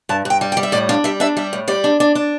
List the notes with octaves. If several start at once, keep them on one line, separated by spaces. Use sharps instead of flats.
G2 A5
G2 G5
G3
G5
G3
E5
A2 D5
D4 F5
G3 E5
D4 E5
G3 E5
A2
G3 D5
D4
D4
D4